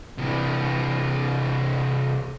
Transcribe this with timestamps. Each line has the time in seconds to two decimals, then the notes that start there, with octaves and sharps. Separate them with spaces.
0.18 C3 E3